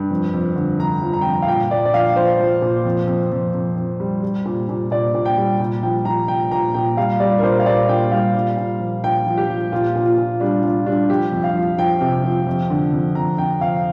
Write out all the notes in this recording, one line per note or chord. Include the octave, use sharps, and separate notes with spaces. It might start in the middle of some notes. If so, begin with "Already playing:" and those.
Already playing: G2
F2
F2
D3
F2 A#5
F3
A#5
G5
F2 A#5
F5
A#2 G5
A#2 D5
D5
F3 F5
F3 C5
F3
A#2
F2
F2
F2
F2
F2
G3
G3
A#2
A#2
A#2 D5
A#2
G5
G3
A#2
F3 G5
F3 A#5
A#2 G5
A#2 A#5
A#2 G5
G3 F5
G3 D5
A#4
A#2 C5
F5
A#2 D5
A#2 G5
G3 F5
A#2
A#2
F3
A#2 G5
F3
G4
F3
A#2 F4
A#2
F4
A#2
G3 D4
G3 F4
G3 D4
F3 G4
F2
F5
F3
F3 G5
C3
F3
F2
D3
F2
F2 A#5
F2 G5
F2 F5